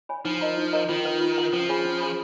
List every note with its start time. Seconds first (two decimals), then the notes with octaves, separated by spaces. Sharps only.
0.09 C#5 G#5 B5
0.25 F3 D#4
0.41 A#4 D#5 A#5
0.58 D#4
0.73 A#4 D#5 A#5
0.89 D#3 F4
1.05 B4 F#5
1.21 F4
1.37 B4 F#5
1.53 F3 C#4
1.69 G#4 C#5 G#5 B5
1.85 C#4
2.00 G#4 C#5 G#5 B5